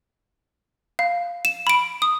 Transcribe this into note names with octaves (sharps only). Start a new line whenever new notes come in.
F5
E7
B5 D7
D#6